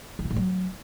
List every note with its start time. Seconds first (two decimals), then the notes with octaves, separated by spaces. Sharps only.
0.19 E3
0.25 B2
0.31 A2
0.36 F#3